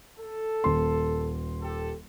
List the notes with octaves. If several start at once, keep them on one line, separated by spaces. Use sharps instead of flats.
A4
D#1 C6
G4 A4